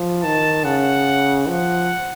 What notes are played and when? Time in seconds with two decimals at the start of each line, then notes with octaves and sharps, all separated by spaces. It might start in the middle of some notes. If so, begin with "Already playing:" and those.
Already playing: F3
0.23 D#3 A5
0.64 C#3 F#5
1.48 F3 F#5